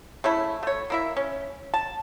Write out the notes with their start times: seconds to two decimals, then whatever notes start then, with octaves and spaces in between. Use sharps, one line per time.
0.24 C#3 A3 E4
0.63 A3 C#5
0.90 A#3 E4 E5
1.17 C#4
1.74 A5